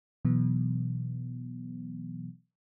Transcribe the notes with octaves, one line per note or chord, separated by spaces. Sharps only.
B2 E3 F#3 B3